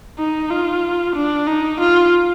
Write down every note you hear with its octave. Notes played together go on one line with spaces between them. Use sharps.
D#4
F4
D4
D#4
F4